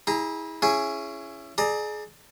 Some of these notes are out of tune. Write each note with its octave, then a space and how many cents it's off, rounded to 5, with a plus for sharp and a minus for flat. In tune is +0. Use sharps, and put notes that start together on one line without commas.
E4 -30 G#4 -15 A#5 +0
C#4 +0 E4 +25 G#4 +0
G#4 +30 D5 +30 A#5 +0